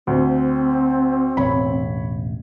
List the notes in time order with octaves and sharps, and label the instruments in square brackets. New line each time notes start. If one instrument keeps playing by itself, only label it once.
[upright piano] D2 [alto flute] C4
[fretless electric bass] E1 A1 [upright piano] C#5 B5